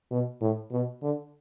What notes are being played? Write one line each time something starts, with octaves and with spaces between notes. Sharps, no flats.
B2
A2
B2
D3